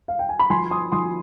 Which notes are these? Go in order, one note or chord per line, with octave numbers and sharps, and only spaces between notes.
F5
G5
G#5
B5
F3 G#5 C6
C6 D#6
F3 C6 D#6